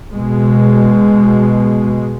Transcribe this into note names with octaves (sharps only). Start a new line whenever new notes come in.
B2 G#3